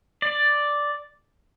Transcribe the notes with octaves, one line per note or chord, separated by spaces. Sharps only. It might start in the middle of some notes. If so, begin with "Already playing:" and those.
D5